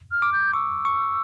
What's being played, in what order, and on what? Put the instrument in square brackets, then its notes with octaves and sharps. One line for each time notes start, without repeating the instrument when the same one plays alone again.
[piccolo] F6
[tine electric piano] D6
[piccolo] G6
[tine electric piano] C#6 [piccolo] E6
[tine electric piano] C#6